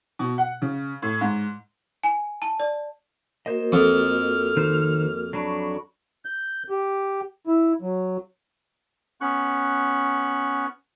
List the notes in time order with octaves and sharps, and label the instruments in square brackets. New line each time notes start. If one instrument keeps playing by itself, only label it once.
[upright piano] B2
F#5
C#3
A2
G#2
[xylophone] G#5
A5
D5
[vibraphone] A#3 F#4 A#4 [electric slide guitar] C5 D#5
[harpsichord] F2 [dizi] F6
[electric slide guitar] D#3 D#4 C5
[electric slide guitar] F#3 D4 [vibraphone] B5 C#6
[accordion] G6
G4
E4
F#3
[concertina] B3 C#4 C#6 F#6